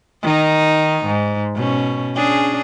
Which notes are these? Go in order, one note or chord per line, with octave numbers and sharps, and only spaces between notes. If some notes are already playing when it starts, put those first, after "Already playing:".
D#3 D#4
G#2
B2 C#4
C#4 D4 G#4